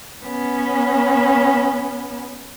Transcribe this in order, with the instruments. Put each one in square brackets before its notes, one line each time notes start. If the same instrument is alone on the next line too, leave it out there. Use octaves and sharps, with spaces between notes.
[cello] B3 C#4